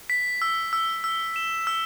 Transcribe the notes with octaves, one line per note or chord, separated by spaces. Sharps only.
B6
E6
E6
E6
E7
E6